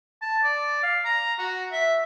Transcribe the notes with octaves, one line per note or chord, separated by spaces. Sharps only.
A5
D5
F5
A#5
F#4
E5